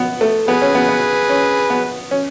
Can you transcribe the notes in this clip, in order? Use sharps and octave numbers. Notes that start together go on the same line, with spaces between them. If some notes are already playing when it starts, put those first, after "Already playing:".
Already playing: B3
A3
B3 G#4 B4
C#4
B3
B3
C#4
B3
C#4